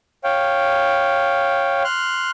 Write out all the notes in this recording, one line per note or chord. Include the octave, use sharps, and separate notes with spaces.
C#5 F5 G5
C6 F6 F#6